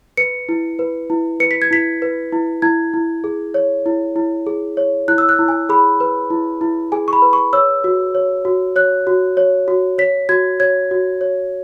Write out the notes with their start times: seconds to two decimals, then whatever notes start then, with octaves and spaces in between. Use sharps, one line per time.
0.17 B4 C#7
0.49 E4
0.79 B4
1.10 E4
1.40 B4 C#7
1.51 B6
1.62 G#6
1.71 E4 B6
2.02 B4
2.32 E4
2.62 E4 G#6
2.94 E4
3.24 G#4
3.54 C#5
3.86 E4
4.16 E4
4.47 G#4
4.77 C#5
5.08 E4 F#6
5.18 E6
5.29 F#6
5.39 E4
5.48 G#5
5.69 G#4 B5
6.00 B4
6.30 E4
6.61 E4
6.92 G#4 G#5
7.08 C#6
7.13 B5
7.22 B4
7.33 C#6
7.53 C#5 E6
7.84 F#4
8.15 C#5
8.45 F#4
8.76 C#5 F#6
9.07 F#4
9.37 C#5
9.68 F#4
9.98 C#5 B6
10.29 F#4 G#6
10.60 C#5 G#6
10.91 F#4
11.21 C#5